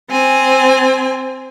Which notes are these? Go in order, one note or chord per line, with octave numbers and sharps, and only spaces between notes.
C4 G#5